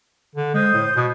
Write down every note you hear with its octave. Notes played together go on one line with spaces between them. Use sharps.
D3
G#3 C5 D#6 G6
A2
B2